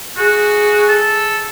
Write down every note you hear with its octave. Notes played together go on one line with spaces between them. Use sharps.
F#4 G#4
A4